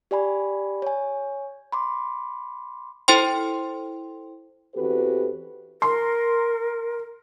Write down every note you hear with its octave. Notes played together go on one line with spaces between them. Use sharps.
G4 D5 G#5 B5
C#5 G#5
B5 C6 D6
E4 A4 C5 G5 C6
E2 C4 F#4 G4 A4 B4
A#4 C6